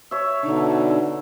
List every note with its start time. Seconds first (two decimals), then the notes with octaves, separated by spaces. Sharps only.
0.11 C#5 E5
0.43 B2 D3 D4 D#4